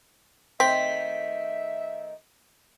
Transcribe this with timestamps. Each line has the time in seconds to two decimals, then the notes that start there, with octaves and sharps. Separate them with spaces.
0.60 D#3 A3 C4 C5 E5 B6